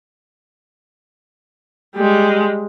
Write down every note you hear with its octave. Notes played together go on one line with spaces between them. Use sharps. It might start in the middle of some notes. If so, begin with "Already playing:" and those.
G3 G#3